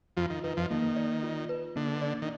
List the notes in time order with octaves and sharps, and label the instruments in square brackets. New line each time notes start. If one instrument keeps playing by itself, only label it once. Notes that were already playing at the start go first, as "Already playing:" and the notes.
[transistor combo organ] F2 F3 [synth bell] F4
[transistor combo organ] D#3
[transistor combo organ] D#3 [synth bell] B4
[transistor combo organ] F2 F3
[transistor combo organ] D#3 [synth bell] A#3
[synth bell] D5
F4
B4
[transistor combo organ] D3 [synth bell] A#3
[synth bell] D5
[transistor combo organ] D#3